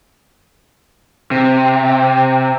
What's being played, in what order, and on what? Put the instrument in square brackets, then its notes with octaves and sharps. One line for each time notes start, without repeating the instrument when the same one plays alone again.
[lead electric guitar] C3